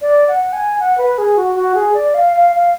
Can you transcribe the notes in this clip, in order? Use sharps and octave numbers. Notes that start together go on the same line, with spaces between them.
D5
F#5
G#5
F#5
B4
G#4
F#4
F#4
G#4
D5
F5
F5
F5